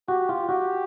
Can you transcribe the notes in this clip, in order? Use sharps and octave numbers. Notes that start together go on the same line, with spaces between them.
F#4 G4
F4
F#4 G4